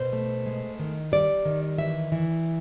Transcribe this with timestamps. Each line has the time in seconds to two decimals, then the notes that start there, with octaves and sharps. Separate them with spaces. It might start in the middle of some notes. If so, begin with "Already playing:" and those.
Already playing: B2 C5
0.13 A3
0.46 G#3
0.79 D#3
1.12 G3 D5
1.45 D#3
1.78 E3 E5
2.12 E3